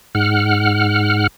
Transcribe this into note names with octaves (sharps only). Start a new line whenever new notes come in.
G#2 F#5 F6